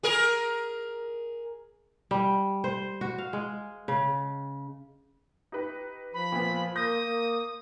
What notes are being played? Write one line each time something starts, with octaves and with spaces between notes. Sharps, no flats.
G#4 A#4
G3
C5
F#4
F5
G#3
C#3
D#4 G4 B4
F3 B5
A#2 B3
A#3 C6 D#6 G6 A#6
A#3